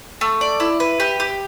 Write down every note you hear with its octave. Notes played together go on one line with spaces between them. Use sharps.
A3
D5
E4
B4
G4
G4